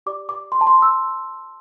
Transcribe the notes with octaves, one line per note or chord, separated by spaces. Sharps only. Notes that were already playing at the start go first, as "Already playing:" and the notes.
G4 D5 D6
D6
C6
A5
C6
E6